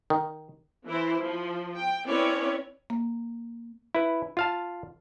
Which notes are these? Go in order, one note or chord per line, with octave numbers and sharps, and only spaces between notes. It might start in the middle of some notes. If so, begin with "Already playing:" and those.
D#3
E3 E4 C5
F3
G5
C4 C#4 E4 B4 C#5 D5
A#3
E4 B4
F4 F5 A5